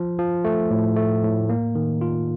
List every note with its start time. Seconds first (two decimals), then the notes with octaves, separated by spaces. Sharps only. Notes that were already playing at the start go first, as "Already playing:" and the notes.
Already playing: F3
0.19 F3
0.44 A3
0.71 A2
0.96 A3
1.23 A2
1.49 A#3
1.75 D#3
2.01 F4